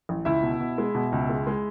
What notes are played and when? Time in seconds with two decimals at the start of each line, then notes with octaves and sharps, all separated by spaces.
0.09 A1
0.25 C#2 E4 E5
0.43 B2
0.60 B2
0.78 G#3
0.95 B2
1.12 C#2
1.29 G#3
1.47 G#3